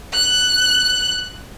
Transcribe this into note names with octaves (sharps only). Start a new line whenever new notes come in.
F#6